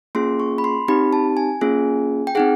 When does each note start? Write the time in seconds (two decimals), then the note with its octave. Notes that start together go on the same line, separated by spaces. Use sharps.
0.15 A#3 C#4 F4 G#4 C6
0.40 C#6
0.58 B5
0.64 C6
0.88 C4 D#4 G4 B5
1.13 A5
1.37 G#5
1.61 A#3 C#4 F4 G#4
2.27 G5
2.35 C4 D#4 G#4 F#5